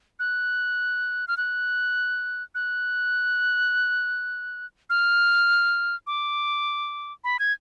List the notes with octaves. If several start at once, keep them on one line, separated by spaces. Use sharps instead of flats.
F#6
F6
F#6
F#6
F6
D6
B5
G#6